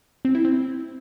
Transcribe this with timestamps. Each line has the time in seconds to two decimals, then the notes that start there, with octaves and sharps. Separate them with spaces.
0.25 C4
0.35 E4
0.45 C4